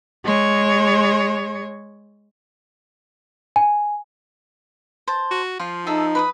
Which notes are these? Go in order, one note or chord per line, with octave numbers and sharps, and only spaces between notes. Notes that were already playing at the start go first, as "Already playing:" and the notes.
G#3 C#5
G#5
C5 A5
F#4
F3 F4
D#4 G#4 A4 E5
B4 D6 D#6